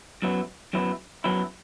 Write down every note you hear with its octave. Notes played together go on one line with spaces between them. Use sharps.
F#2 F#3 B3 E4
F#2 F#3 B3 E4
F#2 F#3 B3 E4